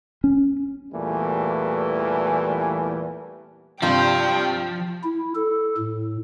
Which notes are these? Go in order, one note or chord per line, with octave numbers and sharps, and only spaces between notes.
C#4
E2 A#2 E3 G3 A3
G2 C3 F3 G3 F4 G5
E4
A4
A2